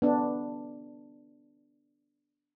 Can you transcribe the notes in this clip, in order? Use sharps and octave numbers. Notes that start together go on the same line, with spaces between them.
B3 D4